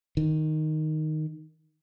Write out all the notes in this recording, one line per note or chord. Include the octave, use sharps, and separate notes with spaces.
D#3